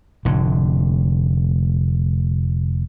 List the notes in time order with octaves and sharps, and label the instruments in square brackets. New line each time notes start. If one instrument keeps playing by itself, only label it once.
[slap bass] F1 A2 D3